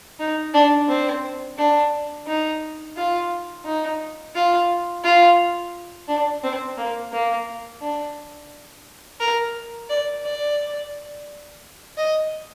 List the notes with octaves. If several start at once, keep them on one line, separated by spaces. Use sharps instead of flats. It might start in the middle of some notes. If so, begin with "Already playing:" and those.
D#4
D4
C4
D4
D#4
F4
D#4
F4
F4
D4
C4
A#3
A#3
D4
A#4
D5
D5
D#5